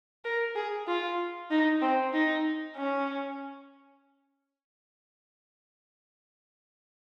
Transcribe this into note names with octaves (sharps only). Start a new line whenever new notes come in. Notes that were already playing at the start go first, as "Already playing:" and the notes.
A#4
G#4
F4
D#4
C4
D#4
C#4